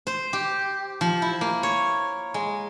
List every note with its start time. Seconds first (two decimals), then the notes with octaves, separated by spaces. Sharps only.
0.07 C5
0.33 G4
1.01 F3
1.22 E4
1.41 A#3
1.63 C#5
2.34 G#3